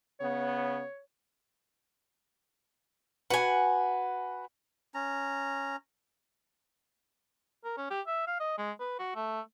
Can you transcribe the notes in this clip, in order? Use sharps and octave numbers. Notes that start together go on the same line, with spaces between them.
C#3 B3 C#5
F#4 B4 F#5 G#5
C#4 A#5
A#4
C#4
G4
E5
F5
D#5
G#3
B4
F#4
A3